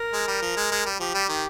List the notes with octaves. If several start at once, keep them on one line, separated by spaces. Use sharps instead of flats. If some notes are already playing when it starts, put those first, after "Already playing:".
Already playing: A#4
G#3
G3
F3
G#3
G#3
G3
F3 G4
G3
D#3